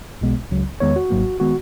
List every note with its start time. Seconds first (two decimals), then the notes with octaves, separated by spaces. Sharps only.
0.21 B1 B2 G#3 B3
0.51 C#2 C#3 F#3
0.80 E2 D#3 G#3 B3 C#5
0.96 F#4
1.10 G#1 G#2 F#3 A#3
1.40 D#3 G#3 B3 F#4